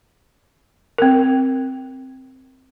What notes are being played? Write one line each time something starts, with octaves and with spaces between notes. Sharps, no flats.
C4 A#4